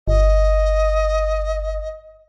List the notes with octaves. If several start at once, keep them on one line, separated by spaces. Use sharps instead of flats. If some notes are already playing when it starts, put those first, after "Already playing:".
G1 D#5